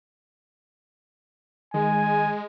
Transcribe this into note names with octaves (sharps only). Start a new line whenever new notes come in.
D#3 G#3 G#5